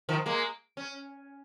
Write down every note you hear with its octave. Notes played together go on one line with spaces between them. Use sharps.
D#3 F3
G#3 A#3
C#4